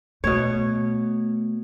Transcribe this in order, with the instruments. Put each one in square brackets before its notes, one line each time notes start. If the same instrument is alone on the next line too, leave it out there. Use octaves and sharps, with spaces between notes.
[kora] B2 C#5 [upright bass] A3